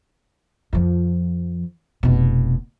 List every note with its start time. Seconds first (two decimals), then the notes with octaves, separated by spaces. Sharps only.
0.73 F2 F3
2.03 F1 B2